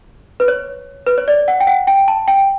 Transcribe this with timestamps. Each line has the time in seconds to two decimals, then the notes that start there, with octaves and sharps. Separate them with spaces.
0.40 B4
0.48 C#5
1.07 B4
1.18 C#5
1.28 D5
1.48 F#5
1.60 G5
1.67 F#5
1.87 G5
2.08 A5
2.28 G5